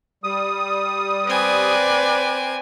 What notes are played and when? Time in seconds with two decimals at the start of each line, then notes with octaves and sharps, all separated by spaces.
0.24 G3 D#6
1.27 C4 B4 D5 G#5